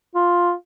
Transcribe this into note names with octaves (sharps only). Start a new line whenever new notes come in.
F4